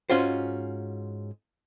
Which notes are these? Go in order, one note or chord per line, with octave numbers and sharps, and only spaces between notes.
G#2 C#4 F4 F#4 C5